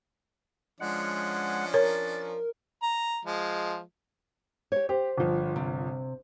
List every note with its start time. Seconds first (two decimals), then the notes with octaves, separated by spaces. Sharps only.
0.80 F3 G#3 C#4 D4 F#5
1.74 A#4 C#5 A6
2.83 A#5
3.25 F3 G#3
4.72 G4 C#5
4.89 G4 C5
5.18 G1 F3
5.56 C3